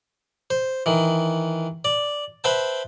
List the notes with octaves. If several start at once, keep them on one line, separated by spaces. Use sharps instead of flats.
C5
D#3 E3
D5
B4 C5 E5 G5 A5